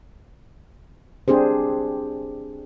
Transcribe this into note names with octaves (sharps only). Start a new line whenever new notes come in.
C4 D4 G4 G#4 C5